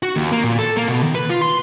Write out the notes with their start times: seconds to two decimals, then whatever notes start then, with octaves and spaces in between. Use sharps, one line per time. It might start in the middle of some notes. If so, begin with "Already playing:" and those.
0.03 F#4
0.16 D#2
0.32 A#3
0.44 A#2
0.58 A4
0.77 A#3
0.88 B2
1.02 D#3
1.15 B4
1.30 F4
1.41 C6